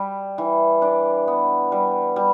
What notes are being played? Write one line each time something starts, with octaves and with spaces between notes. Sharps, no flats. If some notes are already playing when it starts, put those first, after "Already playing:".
Already playing: G3
E3
D4
B3
G3
G3